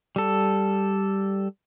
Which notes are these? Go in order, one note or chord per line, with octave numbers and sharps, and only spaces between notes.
G3 A4